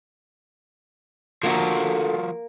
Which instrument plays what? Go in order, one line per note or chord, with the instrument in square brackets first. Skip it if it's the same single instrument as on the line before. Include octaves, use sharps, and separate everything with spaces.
[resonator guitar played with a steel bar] D3 A3 [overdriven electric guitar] F3 F#4 [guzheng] A#3